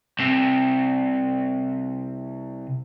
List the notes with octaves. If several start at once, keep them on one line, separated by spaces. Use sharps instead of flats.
C2 C3